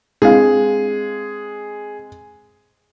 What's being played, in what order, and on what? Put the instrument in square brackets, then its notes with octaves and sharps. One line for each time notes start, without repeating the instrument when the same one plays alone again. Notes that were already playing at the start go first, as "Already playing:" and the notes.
[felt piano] G#3 C4 [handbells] D4 E4 F5 [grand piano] G#4